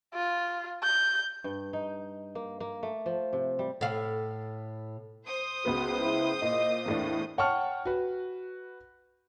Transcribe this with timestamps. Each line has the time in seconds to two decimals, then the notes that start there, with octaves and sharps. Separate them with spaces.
0.14 F4
0.83 G6
1.44 G2
1.73 D#4
2.35 A#3
2.60 A#3
2.83 A3
3.06 F3
3.33 C3
3.59 G3
3.81 A2 F5
5.23 C5 D#6
5.65 C#2 B3 F#4 B4
6.00 E4
6.42 A#2 D#5
6.86 E2 A2 A#3 D4
7.38 C#5 F#5 G5 A5 C#6 F6
7.85 F#4 B4